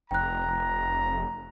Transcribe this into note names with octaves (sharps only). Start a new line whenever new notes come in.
F1 G5 A#5 F#6